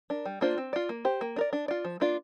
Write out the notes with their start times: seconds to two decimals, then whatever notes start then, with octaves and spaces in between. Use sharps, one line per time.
0.10 D4 A#4
0.25 G3
0.41 A#3 D4 F4 C5
0.58 C4
0.73 F4 D5
0.89 A#3
1.05 G4 C5
1.21 A#3
1.36 D4 A#4 D5
1.53 D4
1.68 F4 D5
1.85 F3
2.00 A#3 D4 F4 D5